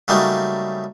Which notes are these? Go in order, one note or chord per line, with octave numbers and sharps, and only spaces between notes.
C#3 F#3 G3 A3 A#3 D#4